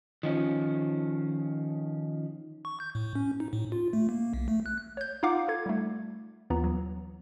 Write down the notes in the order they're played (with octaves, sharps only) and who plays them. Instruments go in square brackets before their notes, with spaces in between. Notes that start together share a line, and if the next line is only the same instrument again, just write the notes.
[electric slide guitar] D#3 F3 C#4
[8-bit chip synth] C#6
G6
A2
C#4
D#4
A2
F4
A3
A#3
B1
A3
F#6
[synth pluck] C#5 G6
D#4 F4 F5 F#5 D6
F4 A4 G#6
G3 A3
D#2 E3 B3 F4 A#5
F#3